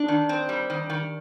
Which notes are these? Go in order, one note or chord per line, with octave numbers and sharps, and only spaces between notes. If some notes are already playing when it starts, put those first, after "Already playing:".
Already playing: D4
D#3
C4
G3
D#3
D#3